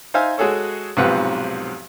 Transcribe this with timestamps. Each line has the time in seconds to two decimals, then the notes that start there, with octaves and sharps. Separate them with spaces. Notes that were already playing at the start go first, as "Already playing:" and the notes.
0.14 D#4 C5 E5 F5 G#5
0.38 G#3 F#4 G#4 A4 C#5
0.97 B1 G#2 C3 F3 B4 F#5